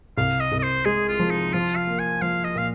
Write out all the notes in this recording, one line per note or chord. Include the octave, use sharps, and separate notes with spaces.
C2 F5
D#5
C2
D#5
C5
G#3 G#4
F4
F3
D#4
F3 F4
F5
A#3
G#5
F3 F5
D#5
A#2 F5